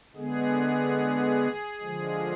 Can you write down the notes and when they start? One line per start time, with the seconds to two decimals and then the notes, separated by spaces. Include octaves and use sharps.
0.16 D3 G#3 B3 G#4
1.80 D3 F3 G#3